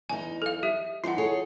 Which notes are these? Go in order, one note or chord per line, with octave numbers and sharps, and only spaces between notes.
E2 D#4 G#5
A4 F5
G4 E5
E3 D4 D#4 F4 F#5
G#4 A4 C#5